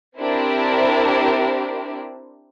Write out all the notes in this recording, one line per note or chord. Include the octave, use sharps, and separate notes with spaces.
C4 D4 E4 G4 A#4 C5